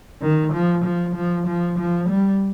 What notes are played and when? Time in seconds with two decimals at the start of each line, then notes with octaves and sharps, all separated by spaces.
0.22 D#3
0.53 F3
0.84 F3
1.15 F3
1.47 F3
1.78 F3
2.09 G3